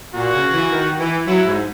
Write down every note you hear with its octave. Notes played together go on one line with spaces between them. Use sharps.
A#2 F#4
C#3
E3
D#3
E3
F#3 E4
G#2